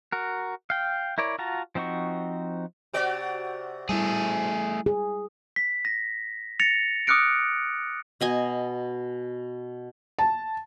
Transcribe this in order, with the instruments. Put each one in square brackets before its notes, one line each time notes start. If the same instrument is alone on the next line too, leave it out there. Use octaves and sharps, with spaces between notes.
[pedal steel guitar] F#4 A#4
F5 G5
E4 A#4 C#5 D5
F4 F#4 A5 A#5
F3 C4 D#4 F#4 C#6
[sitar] C3 F#4 D5
[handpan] G3 E4 [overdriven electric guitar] A3 G#4
[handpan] G#4
[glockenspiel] B6
A#6
A6 A#6 C#7 F7
D6 D#6 F6 F#6 C#7 D7
[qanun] B2 D#5 G#5
[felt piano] A5